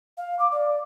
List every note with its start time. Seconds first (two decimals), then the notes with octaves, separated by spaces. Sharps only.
0.17 F5
0.39 D6
0.52 D5